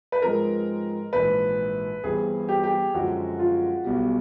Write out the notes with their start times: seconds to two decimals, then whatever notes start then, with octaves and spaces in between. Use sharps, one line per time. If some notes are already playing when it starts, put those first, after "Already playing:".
0.12 B4
0.22 G#2 F3 G#3 C4 A#4
1.13 A#1 G#2 E3 B4
2.04 G1 G2 E3 G3 C4 G#4
2.49 G4
2.63 G4
2.94 F#2 D3 F3 G#3 F#4
3.39 F4
3.84 B1 B2 G3